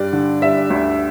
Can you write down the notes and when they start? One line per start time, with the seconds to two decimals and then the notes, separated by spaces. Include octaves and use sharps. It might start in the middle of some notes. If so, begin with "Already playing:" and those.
Already playing: G2 G3 D5
0.13 D3
0.42 G3 E5
0.71 D2